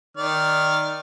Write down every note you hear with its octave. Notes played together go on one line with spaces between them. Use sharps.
D#3 D5 F6